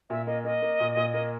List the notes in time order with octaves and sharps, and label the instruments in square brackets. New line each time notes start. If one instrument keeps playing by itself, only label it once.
[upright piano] A#2 [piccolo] E5
[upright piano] A#3 [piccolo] D#5
[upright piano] A#3 [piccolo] D#5
[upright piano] A#3
A#2
A#2
A#3